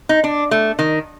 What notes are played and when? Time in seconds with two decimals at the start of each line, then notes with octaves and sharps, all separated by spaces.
0.09 D#4
0.24 D4
0.51 A3
0.79 D#3